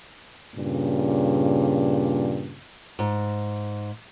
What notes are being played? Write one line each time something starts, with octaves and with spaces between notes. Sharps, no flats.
G2 A#2 C#3
G#2